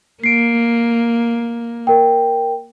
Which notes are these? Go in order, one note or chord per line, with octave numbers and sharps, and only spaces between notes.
A#3 C7 D7
A#4 G5